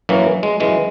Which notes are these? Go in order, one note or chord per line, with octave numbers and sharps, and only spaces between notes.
F#2 E3 F#3 A#3
G#3
F#2 E3 G#3